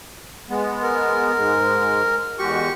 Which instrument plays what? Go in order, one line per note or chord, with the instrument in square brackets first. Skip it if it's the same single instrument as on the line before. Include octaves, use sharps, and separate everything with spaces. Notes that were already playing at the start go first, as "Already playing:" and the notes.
[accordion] G#3 B3
[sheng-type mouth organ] A#4
[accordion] G#2 G#3
[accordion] E2 G#3 F#4 [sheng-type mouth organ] G4 C#6